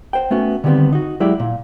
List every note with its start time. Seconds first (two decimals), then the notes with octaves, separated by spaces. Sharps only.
0.13 C5 F#5 G5
0.31 A3 B3 C#4 F#4
0.64 D3 D#3 G3 A3 B3 C4
0.92 D#4 F#4
1.20 F#3 G#3 E4 G4 D5
1.40 A#2